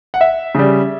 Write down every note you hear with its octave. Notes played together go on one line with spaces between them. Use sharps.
F#5
E5
C#3 G3